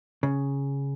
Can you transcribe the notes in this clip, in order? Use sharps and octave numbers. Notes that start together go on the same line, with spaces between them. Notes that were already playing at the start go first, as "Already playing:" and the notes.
C#3